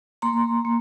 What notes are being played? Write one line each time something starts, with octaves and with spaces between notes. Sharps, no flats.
A#3 A#5 C6
A#3